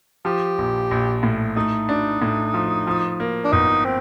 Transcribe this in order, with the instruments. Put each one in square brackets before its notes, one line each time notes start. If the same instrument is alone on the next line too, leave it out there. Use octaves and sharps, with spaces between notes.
[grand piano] F3 [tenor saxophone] G4
[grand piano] A#1
A#1
A2
[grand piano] A3 [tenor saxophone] D#4
[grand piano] D4
A2
F3
F3
A#3
[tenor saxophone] D4
[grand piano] G1 [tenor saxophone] D#4
[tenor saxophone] C4